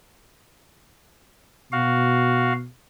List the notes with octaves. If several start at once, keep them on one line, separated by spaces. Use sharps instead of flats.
B2 F#4 F5